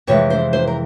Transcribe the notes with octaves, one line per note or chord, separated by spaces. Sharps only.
F2 C3 E3 G#3 C#5
C5
C5
A#4